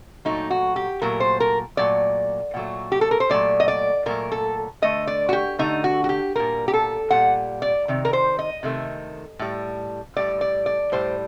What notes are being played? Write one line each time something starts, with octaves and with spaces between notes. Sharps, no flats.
A#2 F#3 A3 D#4
F#4
G4
A#2 F#3 A3 A#4
C5
A#4
A#2 F#3 A3 D5
A#2 F#3 A3
G4
A4
A#4
C5
A#2 F#3 A3 D5
D#5
D5
A#2 F#3 A3 A#4
A4
D3 A3 D#5
D5
F#4
G4
D3 A3 D#4
F#4
F#4
G4
A#2 G3 A#4
G4
A4
A#2 G3 F#5
D5
C3 D#3
A#4
C5
D#5
C3 D#3 A3
A2 G3
A2 G3 D5
D5
D5
A2 G3 C5